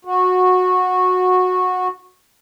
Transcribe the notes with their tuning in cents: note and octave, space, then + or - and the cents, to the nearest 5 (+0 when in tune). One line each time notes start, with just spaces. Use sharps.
F#4 -15